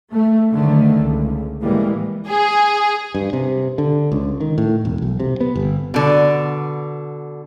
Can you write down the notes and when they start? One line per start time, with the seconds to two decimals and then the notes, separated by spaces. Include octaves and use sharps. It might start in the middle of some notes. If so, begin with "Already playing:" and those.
0.12 A3
0.53 F#1 D3 D#3 A3
0.97 C#2
1.62 A2 C3 E3 G3 G#3 A#3
2.28 G#4
3.15 G2
3.33 C3
3.78 D3
4.12 C#2
4.41 D#3
4.58 A2
4.85 E1
5.02 B1
5.20 C3
5.41 B3
5.55 G1
5.94 B2 D3